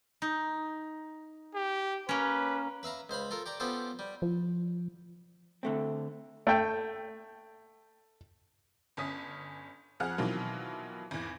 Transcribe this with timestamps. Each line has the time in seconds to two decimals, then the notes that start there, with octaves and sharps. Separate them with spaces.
0.22 D#4
1.55 G4
2.09 A#3 C#4 B4
2.83 B4 E5 F5 A#5
3.09 C#2 C5 F5 B5
3.31 F4 A4 A#4
3.46 G4 D5 A#5
3.60 B3 C#4 F4 G4 A4 C5
3.99 G3
4.22 F3
5.63 D3 A3 C4
6.47 A3 G5
8.97 G1 C#4 D#6 B6
10.00 F2 F3 G#4 F#5 F6
10.18 B2 D#3 E3 F#3 C4 F4
11.11 G#1 E2